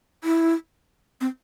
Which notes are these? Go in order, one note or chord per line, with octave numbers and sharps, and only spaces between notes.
E4
C4